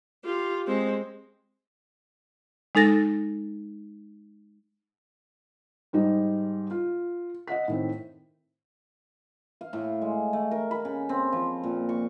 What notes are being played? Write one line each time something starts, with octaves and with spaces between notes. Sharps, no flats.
F4 G4
G#3 C4
G#3 D#4 A4 A6 A#6
G#2 G3 D#4
F4
D#5 E5 F#5 B6
A2 D#3 C4
F5
A2
G#3
A3
A#4
B5
C#3
C4
F3
A#2
C#6